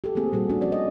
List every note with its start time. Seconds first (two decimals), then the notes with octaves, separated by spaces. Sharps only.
0.04 G4 A4
0.15 A3 A#3 C4 G#4
0.32 A#2 G3 F#4 A4
0.49 A3 C#4 D4 F#4
0.61 F3 C#4 F#4 D5
0.72 D#5